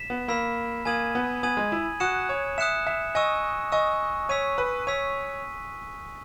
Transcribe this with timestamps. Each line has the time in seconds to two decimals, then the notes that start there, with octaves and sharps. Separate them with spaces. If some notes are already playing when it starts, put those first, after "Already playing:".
Already playing: B6 E7
0.10 B3
0.28 A#3 B5 E6 B6 E7
0.85 A#3 G#5 D#6 G#6 D#7 F#7
1.15 B3
1.43 B3 G#5 D#6 G#6 D#7 F#7
1.57 G#3
1.72 E4
2.00 F#4 D#6 F#6 C#7 E7
2.29 C#5
2.58 E5 D#6 F#6 C#7 E7
2.87 E5
3.15 D#5 G#5 C#6 E6
3.72 D#5 G#5 C#6 E6
4.29 C#5 E6 B6 D#7
4.58 B4
4.87 C#5 E6 B6 D#7